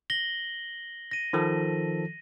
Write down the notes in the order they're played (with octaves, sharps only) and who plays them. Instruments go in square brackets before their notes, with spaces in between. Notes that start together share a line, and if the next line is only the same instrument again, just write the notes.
[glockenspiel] A#6 F#7 G7
A#6 D#7
[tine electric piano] D#3 F3 A4